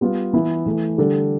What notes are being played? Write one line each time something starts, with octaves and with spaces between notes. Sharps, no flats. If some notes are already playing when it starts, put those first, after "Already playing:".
G3 B3 F4
E3 B3 E4
E3 A3 E4
D3 G3 D4 A4